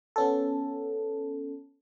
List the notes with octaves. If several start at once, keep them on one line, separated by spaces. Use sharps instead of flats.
B3 C#4 A4